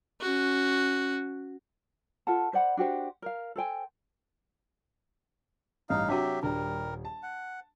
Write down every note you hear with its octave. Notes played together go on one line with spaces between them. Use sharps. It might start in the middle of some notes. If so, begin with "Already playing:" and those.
C#4 F#4
F4 A4 F#5 A5
C5 D5 F#5 B5
D4 F#4 G4 C5
A#4 F5
A4 C5 G5 G#5
A1 G2 D#4 D#5 F5
C3 F#3 D4 F#4 G4 E5
D#1 G3 D4 A#4
A5
F#5